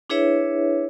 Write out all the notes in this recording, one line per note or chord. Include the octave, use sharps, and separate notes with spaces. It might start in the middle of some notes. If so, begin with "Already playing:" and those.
D4 E4 G#4 B4 C#5 E5